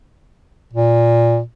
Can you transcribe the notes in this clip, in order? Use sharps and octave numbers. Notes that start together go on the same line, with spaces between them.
A#2